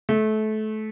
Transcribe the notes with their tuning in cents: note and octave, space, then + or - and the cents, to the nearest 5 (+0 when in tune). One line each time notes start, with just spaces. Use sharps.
A3 -25